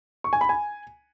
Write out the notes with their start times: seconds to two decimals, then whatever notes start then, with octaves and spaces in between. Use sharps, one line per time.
0.24 C#6
0.33 G#5
0.41 B5
0.49 G#5